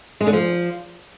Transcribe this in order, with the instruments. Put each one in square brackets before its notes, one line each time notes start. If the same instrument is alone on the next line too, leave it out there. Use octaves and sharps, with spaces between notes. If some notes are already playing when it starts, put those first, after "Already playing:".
[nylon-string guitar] G#3
D3
F3